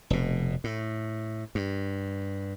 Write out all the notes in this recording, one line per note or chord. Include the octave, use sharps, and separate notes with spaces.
F1 B2
A2
G2